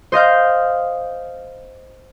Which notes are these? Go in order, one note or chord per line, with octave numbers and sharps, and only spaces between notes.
C5 D#5 F5 G6